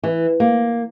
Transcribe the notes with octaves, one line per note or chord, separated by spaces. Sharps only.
E3
A#3